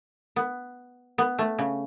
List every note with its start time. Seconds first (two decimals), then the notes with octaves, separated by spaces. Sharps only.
0.36 B3
1.18 B3
1.39 A3
1.59 C#3